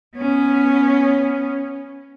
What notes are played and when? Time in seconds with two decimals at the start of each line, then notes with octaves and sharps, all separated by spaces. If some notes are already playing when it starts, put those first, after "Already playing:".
0.17 B3 C#4